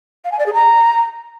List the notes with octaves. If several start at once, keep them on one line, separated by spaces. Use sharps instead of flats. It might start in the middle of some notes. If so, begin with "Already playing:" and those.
F5
G#5
D5
G#4
A#5